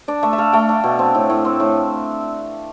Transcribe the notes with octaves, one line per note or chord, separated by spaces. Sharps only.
D4 D5
A3 E5
E5
A3 F5
A3 G5
D4
B2
C4
A2
A2
C4
A2